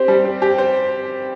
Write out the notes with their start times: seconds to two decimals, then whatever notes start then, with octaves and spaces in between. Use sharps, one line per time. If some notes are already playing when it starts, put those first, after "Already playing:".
Already playing: C4 G4 C5
0.08 G3
0.25 C4
0.42 G4
0.58 C5